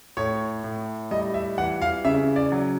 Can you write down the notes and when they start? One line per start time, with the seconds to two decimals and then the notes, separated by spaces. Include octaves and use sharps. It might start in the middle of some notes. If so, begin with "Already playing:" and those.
0.17 A2 C#5
0.64 A2
1.11 G3 D#5
1.34 E5
1.58 E3 F#5
1.82 F5
2.05 C#3 E5
2.36 D5
2.52 F#3